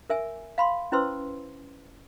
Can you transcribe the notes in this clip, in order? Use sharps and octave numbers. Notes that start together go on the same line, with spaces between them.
A#4 E5 G#5
F5 B5 C6
C#4 E4 B4 C5 C6 E6